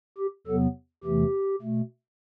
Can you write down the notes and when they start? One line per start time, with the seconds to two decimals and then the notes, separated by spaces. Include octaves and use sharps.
0.18 G4
0.47 E2 C3 F#3 B3 A4
1.04 E2 C3 E3 A3 G4
1.61 B2 A3